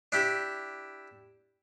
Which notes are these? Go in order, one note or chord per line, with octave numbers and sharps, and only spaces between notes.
D4 E4 G4